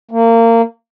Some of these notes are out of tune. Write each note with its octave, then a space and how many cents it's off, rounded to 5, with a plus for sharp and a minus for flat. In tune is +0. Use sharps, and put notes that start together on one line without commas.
A#3 -25